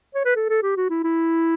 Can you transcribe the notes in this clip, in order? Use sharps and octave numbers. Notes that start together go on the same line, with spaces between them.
C#5
B4
A4
A4
G4
F#4
E4
E4